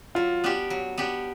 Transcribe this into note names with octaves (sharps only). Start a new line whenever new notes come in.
F#3 F4
B3 D4 G4
F#3
B3 D4 G4